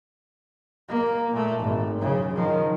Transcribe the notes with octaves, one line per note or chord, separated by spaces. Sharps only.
A#3
A#2 A3
G#1
F#2 C#3
D#3 F3